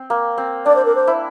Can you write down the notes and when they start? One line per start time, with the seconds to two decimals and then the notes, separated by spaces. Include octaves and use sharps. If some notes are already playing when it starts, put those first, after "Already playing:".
Already playing: C4
0.10 A#3
0.38 C4
0.66 D4 D5
0.76 C5
0.85 A#4
0.95 C5
1.07 E4